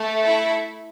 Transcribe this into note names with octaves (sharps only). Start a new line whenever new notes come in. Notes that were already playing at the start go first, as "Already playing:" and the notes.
Already playing: A3 A4
E4 E5